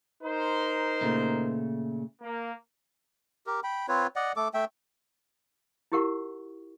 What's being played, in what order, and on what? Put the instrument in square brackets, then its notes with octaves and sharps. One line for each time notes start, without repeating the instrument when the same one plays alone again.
[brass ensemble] D#4 A#4 C5
[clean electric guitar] A#2 C#3 A3
[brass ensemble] A#3
[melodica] G4 A#4
G5 B5
C4 F4 B4 C#5
D5 D#5 F#5
A3 A4 D6
A3 E5 G5
[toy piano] E4 F4 G4 A#4 F#5 C#6